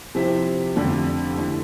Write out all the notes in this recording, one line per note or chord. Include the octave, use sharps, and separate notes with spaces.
C3 F3 C4 E4 G4
F2 D3 A3 D4 G4
D3 A3 E4